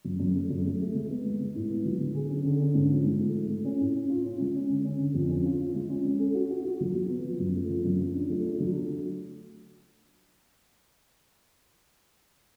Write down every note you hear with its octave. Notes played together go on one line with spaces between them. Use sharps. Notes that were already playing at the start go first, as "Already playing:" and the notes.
F#2
F#2
A3
F#2
A3
A3
G#3
B3
G#3
G#3
A2
B3
F#3
D3
G#4
C#4
D3
C#4
G#2
F3
G#2
A3
F3
A3
C#4
A2
C#4
F4
C#4
G#3
C#4
D3
C#4
D3
F2
C#4
F4
F4
G#3
C#4
C#4
A4
F#4
F#4
F#4
F#3
F#3
B3
F3
F#2
A3
F3
F#2
F3
D4
A3
D4
F#3
A3